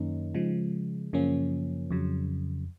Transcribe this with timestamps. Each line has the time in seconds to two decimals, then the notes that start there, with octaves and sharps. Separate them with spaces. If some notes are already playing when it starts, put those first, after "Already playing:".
Already playing: F#2 D#3 A#3 C#4 D#4
0.34 C#3 F3 G#3
1.13 F#2 C#3 F3 A#3 C#4
1.90 F2 C#3 F#3